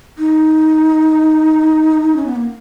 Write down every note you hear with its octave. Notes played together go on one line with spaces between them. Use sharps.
D#4
C#4
B3
A#3